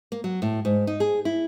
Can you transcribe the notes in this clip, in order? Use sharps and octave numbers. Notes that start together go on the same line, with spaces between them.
A#3
F#3
A2
G#2
D#4
G#4
E4